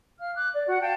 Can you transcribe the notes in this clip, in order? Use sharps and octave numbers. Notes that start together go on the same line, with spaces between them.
F5 F6
D6 F#6
D5
F#4 F#5
F5 G5 A5 G6